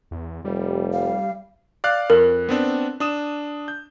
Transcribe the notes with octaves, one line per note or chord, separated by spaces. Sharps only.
E2
F1 G3
F5
D5 F5 F#6
F2 A#4
B3 C4 D4
D4 D#6 E7
G6